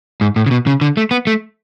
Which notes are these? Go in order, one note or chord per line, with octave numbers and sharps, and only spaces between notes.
G#2
A2
C#3
B2
C#3
D3
A3
B3
A3